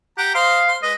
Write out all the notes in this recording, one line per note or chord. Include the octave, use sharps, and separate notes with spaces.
G4 F#5 A#5
C5 D#5 F5
C5
G#3 B4 D#5